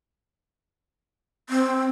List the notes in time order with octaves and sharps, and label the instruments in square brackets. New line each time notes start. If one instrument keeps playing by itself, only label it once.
[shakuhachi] C4